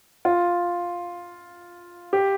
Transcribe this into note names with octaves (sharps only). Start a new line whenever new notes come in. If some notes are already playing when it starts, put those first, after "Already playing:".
F4
G4